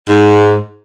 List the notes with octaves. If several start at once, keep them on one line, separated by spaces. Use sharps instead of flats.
G#2